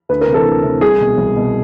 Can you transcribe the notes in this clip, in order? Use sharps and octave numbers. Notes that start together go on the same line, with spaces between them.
D2 B4
A#4
C3
E3 A4
D2
C3 E3
C2 G#4
B2
C2
B2